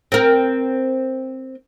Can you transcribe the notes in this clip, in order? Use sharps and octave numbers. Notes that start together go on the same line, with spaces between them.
C4 A#4